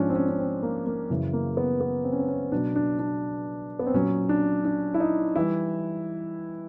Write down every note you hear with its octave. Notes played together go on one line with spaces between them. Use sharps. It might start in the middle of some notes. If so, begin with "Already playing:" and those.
Already playing: G#2 F3 C#4 D4
C4
C#4
C#4
C4
A#3
A#3
F#2 C#3 E3
A#3
B3
B3
C4
C#4
C4
C#4
B2 F#3 D4
D4
D4
B3
C4
A#2 F#3 C#4
D4
D4
E4
D#4
E3 G3 E4